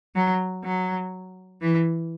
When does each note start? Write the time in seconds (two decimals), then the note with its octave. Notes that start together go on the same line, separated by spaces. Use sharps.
0.15 F#3
0.64 F#3
1.62 E3